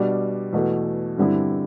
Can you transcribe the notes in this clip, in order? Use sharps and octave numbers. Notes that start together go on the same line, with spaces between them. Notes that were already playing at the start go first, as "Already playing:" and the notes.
Already playing: B2 G3 D4
E2 B2 A3
G2 D3 G3 C4 E4